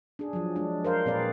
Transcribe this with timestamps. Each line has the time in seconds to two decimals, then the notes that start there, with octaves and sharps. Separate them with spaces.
0.19 D4 G#4
0.33 F3 F#3
0.56 G#3 D4
0.84 A#4 C5 F5
1.06 A#2 C4 G#4 B4 D5 F5